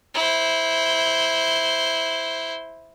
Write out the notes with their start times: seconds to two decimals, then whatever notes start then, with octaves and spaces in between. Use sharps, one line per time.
0.15 E4 C5